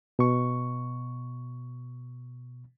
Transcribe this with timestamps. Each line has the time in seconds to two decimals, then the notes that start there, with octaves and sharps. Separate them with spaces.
0.19 B2 C#6